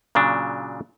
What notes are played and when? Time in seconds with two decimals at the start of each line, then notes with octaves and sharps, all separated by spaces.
0.15 A#2 C#3 F#3 D4